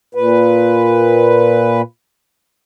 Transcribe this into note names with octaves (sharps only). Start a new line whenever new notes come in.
A#2 B4